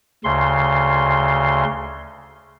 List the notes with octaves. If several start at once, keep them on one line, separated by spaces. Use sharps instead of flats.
D2 C#3 C6